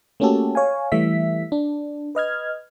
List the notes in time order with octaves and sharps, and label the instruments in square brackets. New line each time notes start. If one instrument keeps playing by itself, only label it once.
[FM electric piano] A3 A#3 C#4 F#4 G4 A4
C#5 F5 G#5
E3 G3 A3 E5 B6
D4
B4 D#5 F6 G#6